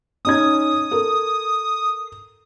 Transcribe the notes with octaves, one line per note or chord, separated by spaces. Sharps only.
C#4 D#4 D#6 G#6
A4 A#4